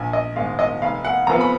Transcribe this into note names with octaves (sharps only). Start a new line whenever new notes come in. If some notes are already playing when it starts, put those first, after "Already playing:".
Already playing: A#1 G#5
D#5
G#2 D#3 G#3 F5
D#5
F1 F5
F#5
F2 F3 B3 A#5
B5